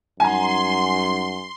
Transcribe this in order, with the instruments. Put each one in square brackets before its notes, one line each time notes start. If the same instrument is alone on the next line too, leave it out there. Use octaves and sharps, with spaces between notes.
[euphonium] F#2 [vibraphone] G3 D#4 F#5 [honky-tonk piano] G#5 A#5 [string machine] C6